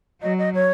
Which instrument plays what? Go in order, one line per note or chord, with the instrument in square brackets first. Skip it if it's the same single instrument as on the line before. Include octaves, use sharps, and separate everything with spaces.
[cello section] F#3 [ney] D#5
[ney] D#5
C#5